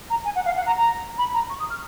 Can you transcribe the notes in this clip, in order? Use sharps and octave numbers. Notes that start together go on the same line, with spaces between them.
A#5
G#5
F#5
F5
F#5
A#5
A#5
B5
A#5
C#6
D#6
F6